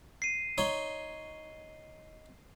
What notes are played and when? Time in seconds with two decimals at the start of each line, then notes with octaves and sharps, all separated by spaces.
0.22 C7 D#7
0.58 D#4 C#5 C6